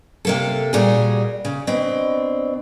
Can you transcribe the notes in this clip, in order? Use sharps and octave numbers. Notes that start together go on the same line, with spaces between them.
C3 A#3 A4
A#2 G3 F#4 G#4
C#3
B2 C4 D4